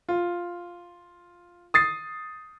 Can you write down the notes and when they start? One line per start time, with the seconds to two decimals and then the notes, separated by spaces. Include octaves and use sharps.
0.09 F4
1.74 D#6 A6 C7